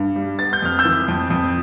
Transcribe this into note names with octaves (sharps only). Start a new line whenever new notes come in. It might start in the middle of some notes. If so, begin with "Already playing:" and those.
Already playing: G2
G3
B3 A6
G6
F2 F6
E6 G6
E3
F2
F2